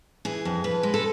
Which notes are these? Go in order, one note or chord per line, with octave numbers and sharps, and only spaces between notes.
E3 G#4
F2
F2 B4
G#3
A4